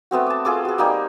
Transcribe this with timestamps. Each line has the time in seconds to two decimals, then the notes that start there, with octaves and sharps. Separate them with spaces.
0.11 A3 B3 C4 F#4
0.26 A5 D6
0.45 F4 G#4 A4 D6
0.65 F#4 G#4
0.78 G3 A#3 D#4 G4